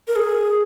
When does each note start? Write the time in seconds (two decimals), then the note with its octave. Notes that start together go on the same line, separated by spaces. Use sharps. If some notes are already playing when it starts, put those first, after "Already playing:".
0.08 A#4
0.16 G#4